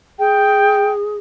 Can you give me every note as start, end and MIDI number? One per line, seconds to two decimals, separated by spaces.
0.19 1.17 68
0.19 0.92 79